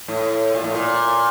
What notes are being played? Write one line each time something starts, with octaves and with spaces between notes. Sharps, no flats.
A2
A#2
A2
A#2